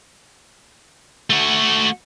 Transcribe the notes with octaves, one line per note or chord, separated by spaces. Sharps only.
A3 F#4